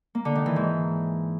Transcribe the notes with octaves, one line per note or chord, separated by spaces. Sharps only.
A#3
D3
D#3
E3
G#2